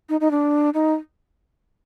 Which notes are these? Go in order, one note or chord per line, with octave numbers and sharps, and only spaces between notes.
D#4
D#4
D4
D#4